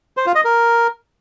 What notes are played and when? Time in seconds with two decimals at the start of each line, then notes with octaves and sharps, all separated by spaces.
0.17 C5
0.26 F4
0.35 D#5
0.44 A#4